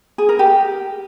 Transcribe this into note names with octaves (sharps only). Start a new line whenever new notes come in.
G#4
A#4
G4